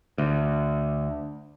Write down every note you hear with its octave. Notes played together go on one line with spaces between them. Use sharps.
D2